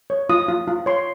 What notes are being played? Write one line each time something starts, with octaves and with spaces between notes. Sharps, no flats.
C#5
F4 D#6
F4
F4
C#5 C6